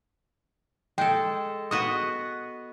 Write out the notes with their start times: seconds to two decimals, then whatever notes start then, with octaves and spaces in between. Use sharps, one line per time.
0.98 G#3 A4 G5
1.71 B3 F#4 D#5 D#6